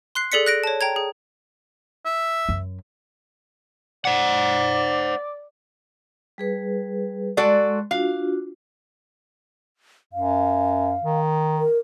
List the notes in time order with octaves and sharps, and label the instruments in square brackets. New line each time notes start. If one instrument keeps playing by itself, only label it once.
[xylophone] C6 F#6 C7
G#4 A4 D5 B6 C#7
F#6 A#6 D7
C#5 A5
G5 A#5 G#6
G#4
[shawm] E5
[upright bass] F#2
[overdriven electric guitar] C5 F#5 [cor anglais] D5
[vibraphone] G3 G#4 B4
[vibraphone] G#3 C6 [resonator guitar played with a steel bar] F#4 A4 D5
[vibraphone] D4 F4 F#4 [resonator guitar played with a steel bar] F5
[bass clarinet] F#2 [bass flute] F5
[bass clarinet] D#3
[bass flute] A#4